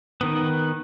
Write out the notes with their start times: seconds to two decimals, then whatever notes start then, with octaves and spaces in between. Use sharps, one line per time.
0.21 D#3 B3